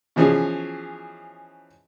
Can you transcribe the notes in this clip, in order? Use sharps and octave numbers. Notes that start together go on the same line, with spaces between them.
B2 E3 F3 C#4 G#4